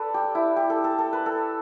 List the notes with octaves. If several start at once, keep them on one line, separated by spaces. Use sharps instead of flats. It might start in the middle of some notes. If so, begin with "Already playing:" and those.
Already playing: A4 B4 D5
G4
E4
G4
A4
A4
A4
B4
A4